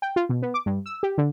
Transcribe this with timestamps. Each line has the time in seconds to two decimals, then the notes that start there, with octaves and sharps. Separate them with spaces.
0.02 G5
0.16 F4
0.29 B2
0.42 B3
0.54 D6
0.66 G2
0.86 E6
1.03 G4
1.18 D3